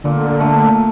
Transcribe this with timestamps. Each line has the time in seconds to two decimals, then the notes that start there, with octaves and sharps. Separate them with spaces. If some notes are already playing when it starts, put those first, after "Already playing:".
0.04 A#2 D3
0.41 A3